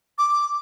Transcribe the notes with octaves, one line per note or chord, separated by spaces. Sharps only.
D6